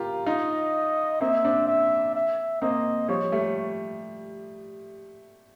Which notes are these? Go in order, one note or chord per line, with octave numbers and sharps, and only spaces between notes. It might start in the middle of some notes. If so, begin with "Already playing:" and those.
Already playing: F4 G4 A#4
D#4 F4 D#5
A#3 C4 E5
C4 D4
E5
E5
A#3 C4 D#5
F3 G3 C#5
G3 A3